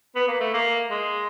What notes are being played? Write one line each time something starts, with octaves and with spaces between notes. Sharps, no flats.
B3
A#3
A3
A#3
G#3